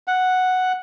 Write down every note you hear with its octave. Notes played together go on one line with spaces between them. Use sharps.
F#5